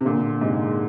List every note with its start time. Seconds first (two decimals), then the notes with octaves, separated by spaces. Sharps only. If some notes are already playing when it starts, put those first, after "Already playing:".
0.01 C3
0.05 A#2 D3
0.41 G#2 C3